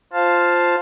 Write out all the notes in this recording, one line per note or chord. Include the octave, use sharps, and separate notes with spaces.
F4 C5 F5 A5